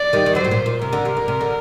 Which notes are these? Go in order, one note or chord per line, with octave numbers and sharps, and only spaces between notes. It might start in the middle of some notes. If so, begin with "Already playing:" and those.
Already playing: D5
D#3 G3
D#3
D3 F#3 C5
A2
A#2
A#2
C3 A#4
D3
C3
D3
C3
D3